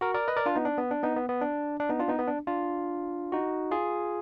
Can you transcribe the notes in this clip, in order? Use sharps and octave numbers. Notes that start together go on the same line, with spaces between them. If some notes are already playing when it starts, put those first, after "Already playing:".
F#4 A#4
A#4 D5
B4 D#5
A#4 D5
D4 F4
B3 D#4
D4
B3
D4
B3 D#4
B3
B3
D4
D4
B3 D#4
D4 F4
B3 D#4
B3
D4
D4 F4
D#4 F#4
F4 G#4